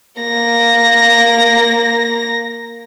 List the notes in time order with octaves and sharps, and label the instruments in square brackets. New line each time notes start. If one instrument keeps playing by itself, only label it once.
[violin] A#3 A#6